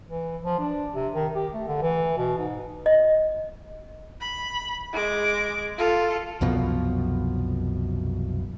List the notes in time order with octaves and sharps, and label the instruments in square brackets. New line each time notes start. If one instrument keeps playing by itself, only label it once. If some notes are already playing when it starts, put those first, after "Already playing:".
[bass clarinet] E3
F3
D4
C3
D#3
G4
A3
D3
E3
B2
G#2
[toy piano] D#5
[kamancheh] B5
G#3 D6
F4 A4
[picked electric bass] C2 F#2 B2 F3